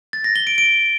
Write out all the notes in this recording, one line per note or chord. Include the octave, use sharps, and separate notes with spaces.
A6
A#6
G7
D7
D7